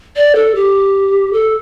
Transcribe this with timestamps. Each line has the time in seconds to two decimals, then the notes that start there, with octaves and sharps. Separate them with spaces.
0.16 D5
0.35 A4
0.55 G4
1.33 A4